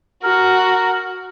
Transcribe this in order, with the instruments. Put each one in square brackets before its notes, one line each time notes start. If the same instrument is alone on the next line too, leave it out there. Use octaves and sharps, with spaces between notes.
[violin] F#4 [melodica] A#4